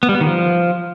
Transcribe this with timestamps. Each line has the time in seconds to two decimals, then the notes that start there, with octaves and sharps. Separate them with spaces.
0.03 B3
0.09 G3
0.15 B3
0.21 D#3
0.27 F3